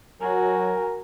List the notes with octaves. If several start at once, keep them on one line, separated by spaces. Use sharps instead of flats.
F#3 F#4 A#4 G#5